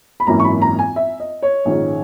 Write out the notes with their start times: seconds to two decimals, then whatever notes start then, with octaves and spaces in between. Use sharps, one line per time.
0.20 B5
0.27 G#1 F#2 E3 A#3 A#5
0.40 C#6
0.44 B5
0.62 A#5
0.79 G#5
0.96 E5
1.20 D#5
1.43 C#5
1.65 A#1 G#2 D#3 G#3 C#4